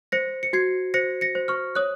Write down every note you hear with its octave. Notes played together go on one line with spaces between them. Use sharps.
C5 A#6 C#7
C#7
F#4 G#6 C7
C5 A#6 C#7
A#6 C#7
C5
C#6 F6
C#5 D#6 F#6